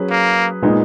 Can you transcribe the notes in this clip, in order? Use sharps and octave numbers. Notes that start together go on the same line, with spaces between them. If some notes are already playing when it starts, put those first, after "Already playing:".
Already playing: F#3 C#4 G#4 B4
A#3
A#2 G#3 B3 D#4